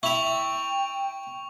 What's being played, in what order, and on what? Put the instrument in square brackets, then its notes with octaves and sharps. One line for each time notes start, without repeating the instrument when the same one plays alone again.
[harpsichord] E4 E5 [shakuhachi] G5 [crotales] C#6 F7